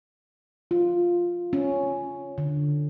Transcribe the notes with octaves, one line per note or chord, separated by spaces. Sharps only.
F4
C#4
D3